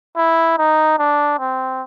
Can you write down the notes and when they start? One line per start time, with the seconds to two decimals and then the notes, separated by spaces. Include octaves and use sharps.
0.17 E4
0.58 D#4
0.99 D4
1.39 C4